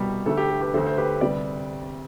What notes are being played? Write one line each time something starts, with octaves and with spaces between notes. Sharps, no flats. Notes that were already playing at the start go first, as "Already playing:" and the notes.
Already playing: C2 B2 G3 G4
D2 D3 A3 A4
G4
A4
G4 B4
D2 D3 A3 A4 C5
C5
G4 B4
D2 C3 G3 B4 D5